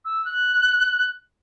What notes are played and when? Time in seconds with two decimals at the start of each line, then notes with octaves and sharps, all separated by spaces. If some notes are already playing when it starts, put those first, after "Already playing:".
0.05 E6
0.25 F#6